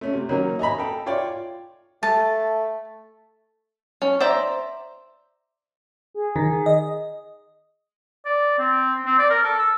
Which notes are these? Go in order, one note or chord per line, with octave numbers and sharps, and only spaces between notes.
A3 C#4
C3
D#3 F#3 A#3 C#4
D#5 G#5 A#5 B5
A4 G5
F4 C#5 D5 G5
A3 A5
C#4
C5 D5 E5 A#5
G#4
D#3
D#5
D5
C4
C4
D5
A#4
A4
E6